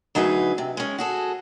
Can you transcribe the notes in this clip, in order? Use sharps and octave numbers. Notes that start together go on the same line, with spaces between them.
D2 F#3 D#4 G#4 B4
C3
G#3 C#4
F#4 G#4 A4